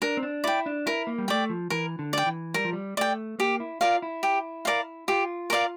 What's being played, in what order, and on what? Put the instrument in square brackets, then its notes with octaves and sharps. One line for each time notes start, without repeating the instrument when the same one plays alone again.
[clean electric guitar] D4 [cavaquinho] A#4
[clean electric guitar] C4
D4
[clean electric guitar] E4 [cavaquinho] D5 G5
[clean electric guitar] D4
[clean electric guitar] E4 [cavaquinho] A#4
[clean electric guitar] A#3
G3
[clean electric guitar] A3 [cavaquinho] D5 G5
[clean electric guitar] F3
[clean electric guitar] E3 [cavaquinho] A#4
[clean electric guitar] D3
[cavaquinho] D5 G5
[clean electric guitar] E3
[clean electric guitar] G3 [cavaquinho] A#4
[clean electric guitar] F3
G3
[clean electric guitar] A3 [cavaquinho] D5 G5
[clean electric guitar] A#3 [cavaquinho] G4
[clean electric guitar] E4
[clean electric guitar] F4 [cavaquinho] A#4 D5 F5
[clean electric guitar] E4
[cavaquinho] G4
A#4 D5 F5
[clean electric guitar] F4 [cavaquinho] G4
[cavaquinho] A#4 D5 F5